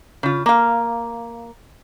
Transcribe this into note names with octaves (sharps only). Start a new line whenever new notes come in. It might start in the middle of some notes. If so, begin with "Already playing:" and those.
C#3 F4
A#3 F5